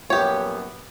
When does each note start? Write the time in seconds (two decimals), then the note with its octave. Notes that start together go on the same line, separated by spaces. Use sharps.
0.10 A#1 F#2 B3 G4 C#5